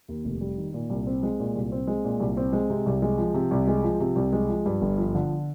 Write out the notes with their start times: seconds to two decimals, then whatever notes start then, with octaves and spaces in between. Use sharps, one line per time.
0.08 D#2
0.25 F1
0.41 G3
0.58 D#3
0.74 A#2
0.90 C2
1.07 C4
1.23 G#3
1.40 A#2
1.55 C2
1.72 C4
1.87 G#3
2.05 A#2
2.20 C2
2.37 C4
2.53 G#3
2.70 C3
2.86 C2
3.02 G#3
3.18 F3
3.34 C3
3.51 C2
3.67 G#3
3.83 F3
4.00 C3
4.16 C2
4.33 G#3
4.49 F3
4.66 G2
4.81 G1
4.98 F3
5.15 D3